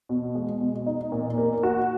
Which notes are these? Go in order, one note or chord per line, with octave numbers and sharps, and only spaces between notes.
B2
G#3
B2
D#4
A#2
A#3
F#4